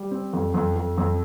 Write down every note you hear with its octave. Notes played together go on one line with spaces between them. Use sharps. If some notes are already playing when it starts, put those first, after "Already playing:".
Already playing: G3
C4
F2
F2
F2
F2